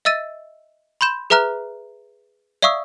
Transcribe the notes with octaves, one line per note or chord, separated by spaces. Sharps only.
D#5 E5 E6 A6 D#7
B5 C6 G6 E7
G#4 B4 E5 A#5 F6 F#6
D5 E5 F5 C#6 D#6 E6